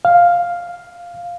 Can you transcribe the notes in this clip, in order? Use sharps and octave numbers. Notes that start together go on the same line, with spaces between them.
F5